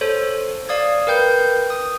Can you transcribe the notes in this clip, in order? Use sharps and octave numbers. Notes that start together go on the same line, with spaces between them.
A4 C5 C#5
D5 F5 D#6 G#6
A#4 B4 G5 G6
D#6